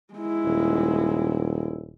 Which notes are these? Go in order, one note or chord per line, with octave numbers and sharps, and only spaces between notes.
G#3 E4
D#1